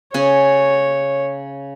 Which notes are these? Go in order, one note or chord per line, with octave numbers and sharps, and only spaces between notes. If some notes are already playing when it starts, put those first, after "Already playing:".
C#3 C#4 C#5